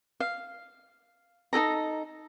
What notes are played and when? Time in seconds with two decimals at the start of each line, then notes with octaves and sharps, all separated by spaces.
0.20 F5
1.53 D#4 G#4 A4 A#5